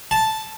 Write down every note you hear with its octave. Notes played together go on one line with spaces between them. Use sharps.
A5